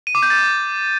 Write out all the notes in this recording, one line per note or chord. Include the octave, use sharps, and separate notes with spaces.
D#7
D6
G6
A6